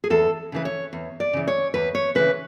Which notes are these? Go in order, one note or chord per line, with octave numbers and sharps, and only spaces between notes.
G#4
E2 A4
C#3 E3 B4
C#5
E2
D5
C#3 E3
C#5
E2 B4
C#5
C#3 E3 B4